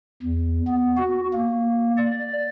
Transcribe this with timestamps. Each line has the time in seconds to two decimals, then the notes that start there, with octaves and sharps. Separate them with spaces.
0.23 E2
0.67 B3
0.97 F#4
1.34 A#3
1.98 D5